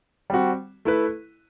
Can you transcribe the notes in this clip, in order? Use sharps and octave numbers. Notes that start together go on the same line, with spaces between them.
G3 C4 F#4
A3 E4 B4